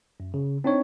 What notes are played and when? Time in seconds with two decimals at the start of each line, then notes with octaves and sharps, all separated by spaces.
0.20 F#2
0.34 C#3
0.64 C4 D4 D#4 C#5